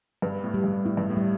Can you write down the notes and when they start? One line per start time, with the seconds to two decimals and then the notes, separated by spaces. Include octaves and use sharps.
0.22 G2 B4
0.44 A2
0.54 G3
0.64 G2
0.85 A2 E4
0.97 G2
1.10 A2
1.17 G3